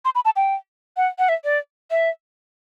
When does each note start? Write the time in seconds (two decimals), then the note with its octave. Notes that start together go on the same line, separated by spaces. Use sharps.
0.05 C6
0.15 B5
0.25 A5
0.36 G5
0.97 F#5
1.19 F#5
1.29 E5
1.44 D5
1.91 E5